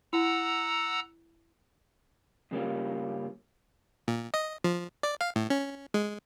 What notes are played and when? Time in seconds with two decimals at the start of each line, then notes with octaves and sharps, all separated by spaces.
0.13 E4 F#5 A#5 E6
2.51 G2 C#3 G3 A#3 C#4 F4
4.08 A#2
4.34 D#5
4.64 F3
5.03 D5
5.21 F5
5.36 A2
5.50 C#4
5.94 G#3